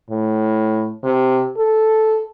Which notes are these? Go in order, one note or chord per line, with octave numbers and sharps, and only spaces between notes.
A2
C3
A4